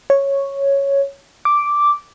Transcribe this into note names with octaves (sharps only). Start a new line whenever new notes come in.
C#5
D6